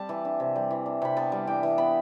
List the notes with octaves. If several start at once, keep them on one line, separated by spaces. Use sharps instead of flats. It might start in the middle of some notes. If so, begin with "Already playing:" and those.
Already playing: G3 C4 G5 A5
E3
D4
C3
G3
E3
D4
C3 B5
B3 A5
G3
E3 G5
E3
B3 B5